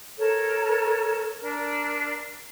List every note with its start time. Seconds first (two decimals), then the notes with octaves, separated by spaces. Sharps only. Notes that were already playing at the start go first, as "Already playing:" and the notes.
0.18 A4 A#4 C#5
1.41 D4 A#4